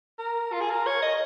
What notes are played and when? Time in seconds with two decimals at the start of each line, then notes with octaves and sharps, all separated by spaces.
0.19 A#4
0.52 F4
0.60 G#4
0.70 A#4
0.86 C#5
1.02 D#5